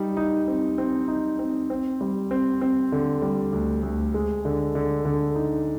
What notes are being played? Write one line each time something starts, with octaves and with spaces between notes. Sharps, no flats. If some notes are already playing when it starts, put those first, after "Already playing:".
Already playing: G3 D#4
D#4
C4
C4
D#4
C4
C4
G3
C4
C4
D3
G3
D2
D2
G#3
D3
D3
D3
D#4